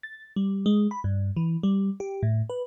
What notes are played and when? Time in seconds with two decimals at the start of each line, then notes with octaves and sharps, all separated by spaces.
0.03 A6
0.36 G3
0.66 G#3
0.91 B5
1.04 G2
1.37 E3
1.63 G3
2.00 G4
2.23 A2
2.50 B4